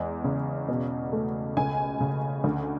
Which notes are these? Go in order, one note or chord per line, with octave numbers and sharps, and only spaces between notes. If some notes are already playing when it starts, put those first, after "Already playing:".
Already playing: E2 G#3
C#3
B2
A3
C#2 G#5
C#3
D2